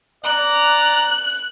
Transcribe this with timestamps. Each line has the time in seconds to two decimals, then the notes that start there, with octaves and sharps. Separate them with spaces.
0.25 D5 A#5 F#6